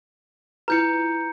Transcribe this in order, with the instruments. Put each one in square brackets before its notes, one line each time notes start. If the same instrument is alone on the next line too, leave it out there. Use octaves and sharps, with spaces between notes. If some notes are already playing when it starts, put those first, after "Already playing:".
[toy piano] E4 F4 B4 [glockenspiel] A#5 G6 C#7